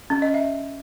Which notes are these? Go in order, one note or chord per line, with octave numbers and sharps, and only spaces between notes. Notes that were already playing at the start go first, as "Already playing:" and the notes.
C#4
D#5
E5